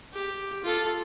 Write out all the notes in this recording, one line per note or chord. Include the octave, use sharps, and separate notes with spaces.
G4
F4 A4